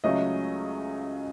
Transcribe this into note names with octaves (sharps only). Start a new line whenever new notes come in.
C#2 C#3 F#3 A3 D#5